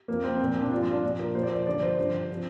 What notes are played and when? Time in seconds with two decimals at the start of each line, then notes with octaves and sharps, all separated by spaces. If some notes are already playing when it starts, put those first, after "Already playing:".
0.08 F2 F3 A#3
0.24 C4
0.40 A#2 F3 A#3
0.51 C4
0.61 D4
0.71 G2 F3 F4
0.82 F4
0.93 D4
1.03 A#2 F3
1.19 A#4
1.35 A#2 F3 C5
1.43 D5
1.50 C5
1.66 G2 D3 F3 D5
1.83 C5
1.98 G2 D3 F3 C5
2.31 C3 F3